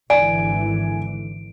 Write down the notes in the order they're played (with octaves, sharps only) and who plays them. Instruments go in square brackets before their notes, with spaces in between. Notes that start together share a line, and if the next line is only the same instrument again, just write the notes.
[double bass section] G#1 D3 E3 [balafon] D5 [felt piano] G#5 [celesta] D7